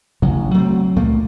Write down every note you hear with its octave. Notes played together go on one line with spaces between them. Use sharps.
A1 C#3 F#3
F#3 A3 B3 C4
C#2 A#2 A3 A#3